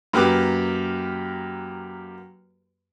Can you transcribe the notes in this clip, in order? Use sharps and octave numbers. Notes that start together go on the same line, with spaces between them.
F#2 A#3 G4 B4 D6